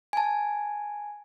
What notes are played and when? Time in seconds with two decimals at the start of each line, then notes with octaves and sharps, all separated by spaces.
0.13 G#5 A5